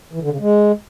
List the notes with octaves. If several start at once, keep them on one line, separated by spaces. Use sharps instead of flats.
E3
D3
C#3
G#3